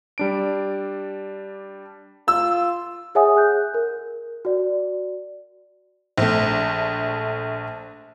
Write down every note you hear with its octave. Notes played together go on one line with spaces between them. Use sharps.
G3 D4 D7
F4 E6
G#4 C#5 E5 F#5 G#5 D#6
G#4 F#6 G6
A#4
F#4 D5
A#1 A3